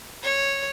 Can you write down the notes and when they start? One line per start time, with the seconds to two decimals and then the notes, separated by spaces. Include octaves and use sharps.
0.23 C#5